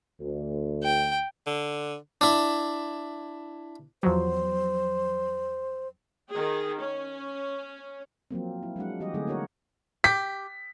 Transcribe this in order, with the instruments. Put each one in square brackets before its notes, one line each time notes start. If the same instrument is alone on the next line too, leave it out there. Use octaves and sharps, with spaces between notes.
[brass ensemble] D2
[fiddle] G5
[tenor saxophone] D3
[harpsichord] D4 E4
[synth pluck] E2 F3 F#3 [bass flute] C5
[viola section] D#3 G#4 G5
C#4
[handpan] F3 F#3 A#3 C4
E4
F#3 G#3 D4 F#5
E3 G3 F#4 G4 D#5
D3 F#3 A3 C4 D#4 G#4
A#3 D4 F#4 A#4 C#5 F#5
[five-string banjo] G4 [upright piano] B6